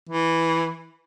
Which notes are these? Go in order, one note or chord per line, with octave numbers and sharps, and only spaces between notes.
E3